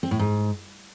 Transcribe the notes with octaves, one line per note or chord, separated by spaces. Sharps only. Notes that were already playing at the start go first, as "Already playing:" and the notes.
C4
A2
G#2